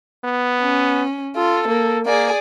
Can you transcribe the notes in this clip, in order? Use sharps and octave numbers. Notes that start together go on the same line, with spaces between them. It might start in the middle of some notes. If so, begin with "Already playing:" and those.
B3
C#4
F4 A4
A#3
A#3 G#4 D5